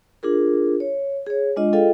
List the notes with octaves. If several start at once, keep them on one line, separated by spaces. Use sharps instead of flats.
D4 F4 G#4 A#4
C#5
G#4 C#5
G#3 D4 F4 D#5
F4 G#4 A4 D#5 F5 G5